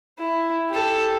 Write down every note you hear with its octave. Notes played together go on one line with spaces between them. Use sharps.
E4
G4 A4